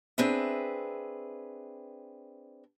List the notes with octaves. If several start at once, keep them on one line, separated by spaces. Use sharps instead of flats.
C4 D4 G#4 B4 E5